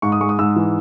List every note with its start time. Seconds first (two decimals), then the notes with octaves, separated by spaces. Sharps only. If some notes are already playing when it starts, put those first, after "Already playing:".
0.02 G#2 C#6
0.12 D#6
0.21 G#3 C#6
0.29 D#6
0.39 G#2 E6
0.56 E3